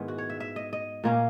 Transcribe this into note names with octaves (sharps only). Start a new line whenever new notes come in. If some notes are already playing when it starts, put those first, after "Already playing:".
Already playing: G#2 D#3 G#3 B3 E4
F#4
C#5
E5
E5
D#5
D#5
A#2 A#3 C#4